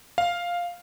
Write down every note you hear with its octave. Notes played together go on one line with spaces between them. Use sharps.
F5